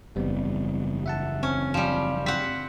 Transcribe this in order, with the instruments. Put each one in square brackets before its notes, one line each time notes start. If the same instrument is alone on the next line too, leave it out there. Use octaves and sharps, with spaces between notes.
[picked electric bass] F#1 E2 [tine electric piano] G3 B3 C4
[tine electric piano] E5 F#5 A5
[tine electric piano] C4 [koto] C#4
[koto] F3 G3
[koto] C4 F#5 [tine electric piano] B6